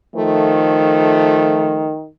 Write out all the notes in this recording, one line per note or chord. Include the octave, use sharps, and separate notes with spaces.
D#3 F3 A3